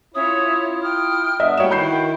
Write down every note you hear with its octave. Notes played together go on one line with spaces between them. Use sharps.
C#4 E4 F4 C#5 E5 D#6
G5 D#6 F6
B3 D4 D#5 E5
G3 A3 A#3 F#4 B4 C#5 G5 E7
D#3 E4 B5 G6 C7
A#4